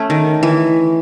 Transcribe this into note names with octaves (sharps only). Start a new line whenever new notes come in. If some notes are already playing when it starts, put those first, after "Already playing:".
Already playing: A3 C#4
D#3
E3